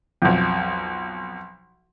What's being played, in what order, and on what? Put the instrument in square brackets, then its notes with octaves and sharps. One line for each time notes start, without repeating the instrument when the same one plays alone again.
[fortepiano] B1 F2